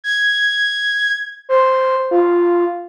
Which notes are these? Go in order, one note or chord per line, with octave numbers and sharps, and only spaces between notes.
G#6
C5
F4